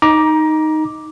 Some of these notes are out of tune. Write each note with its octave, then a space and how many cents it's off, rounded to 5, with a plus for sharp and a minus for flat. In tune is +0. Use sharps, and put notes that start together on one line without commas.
D#4 +0 A#5 +20 D6 +0